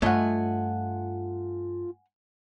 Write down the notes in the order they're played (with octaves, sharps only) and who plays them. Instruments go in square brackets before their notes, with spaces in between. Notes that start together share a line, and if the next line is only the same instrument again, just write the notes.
[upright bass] G2 [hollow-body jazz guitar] A3 C#5 D#5 [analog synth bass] F4 [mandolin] F#5 G#5